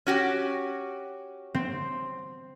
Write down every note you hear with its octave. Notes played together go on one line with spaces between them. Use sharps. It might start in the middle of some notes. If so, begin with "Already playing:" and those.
C#4 F#4 G4
C4